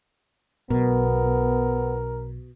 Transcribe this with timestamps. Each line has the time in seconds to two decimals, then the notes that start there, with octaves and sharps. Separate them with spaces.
0.70 B1 B2 B3 A#4